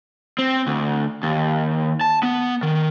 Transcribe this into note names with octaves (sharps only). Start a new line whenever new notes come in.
C4
D2
D#2
A5
B3
D#3